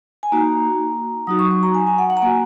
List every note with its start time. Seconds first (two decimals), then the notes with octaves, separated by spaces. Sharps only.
0.23 G#5
0.32 A#3 D#4 F#4 A#5
1.27 F#3 D#4 F#4 D#6
1.39 C#6
1.51 C#6
1.63 A#5
1.74 G#5
1.87 G#5
1.98 F#5
2.10 F#5
2.17 A#5
2.22 A#3 F#4 G#5